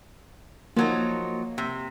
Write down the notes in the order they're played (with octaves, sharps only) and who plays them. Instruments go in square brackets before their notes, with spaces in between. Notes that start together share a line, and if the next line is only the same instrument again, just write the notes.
[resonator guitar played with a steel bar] F3 F#3 D#4 [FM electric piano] A#3
[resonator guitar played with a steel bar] C3